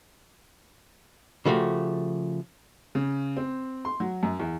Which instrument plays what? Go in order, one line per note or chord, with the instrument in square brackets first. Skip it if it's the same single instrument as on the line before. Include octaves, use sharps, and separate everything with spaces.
[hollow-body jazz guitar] C#3 F3 A3 F#4 G4
[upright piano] C#3
C4
C6
F#3
F#2
E2